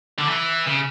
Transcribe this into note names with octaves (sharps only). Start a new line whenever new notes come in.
D3
E3
C#3